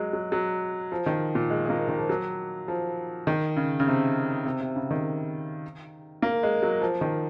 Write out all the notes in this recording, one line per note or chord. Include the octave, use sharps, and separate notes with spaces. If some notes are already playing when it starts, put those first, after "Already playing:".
Already playing: F#3 G#3
F#3
F#3
F3
D#3
A#2
G#3
G#3
A#3
D#3
F3
F#3
F3
D#3
C#3
C#3
C3
C3
C3
C#3
D#3
A#3
G#3
F#3
F3
D#3